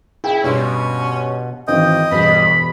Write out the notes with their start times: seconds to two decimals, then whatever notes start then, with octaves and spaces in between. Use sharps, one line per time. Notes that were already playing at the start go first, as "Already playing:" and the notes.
0.24 E4 G#4 G5
0.44 G2 B2 C#4 C6
1.68 G#1 D#3 E3 D#5 G5
2.12 E1 G2 B5 B6